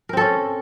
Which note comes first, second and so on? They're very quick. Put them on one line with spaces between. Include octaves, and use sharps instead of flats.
A#4 C4 A4 C#4